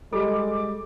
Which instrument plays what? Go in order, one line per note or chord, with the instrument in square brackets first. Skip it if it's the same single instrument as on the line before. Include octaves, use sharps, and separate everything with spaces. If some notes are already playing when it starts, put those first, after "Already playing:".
[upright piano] G3 [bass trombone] G#3 [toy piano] A4 [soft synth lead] D6